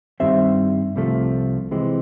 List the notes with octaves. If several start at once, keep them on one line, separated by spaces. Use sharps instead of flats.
G2 D#3 G3 C4 E5
C2 C3 F3 A3
C3 E3 G#3 C4